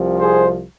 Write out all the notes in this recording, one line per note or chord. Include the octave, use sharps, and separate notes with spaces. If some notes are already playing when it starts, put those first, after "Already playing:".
Already playing: C2 C3 F3
G#4 C5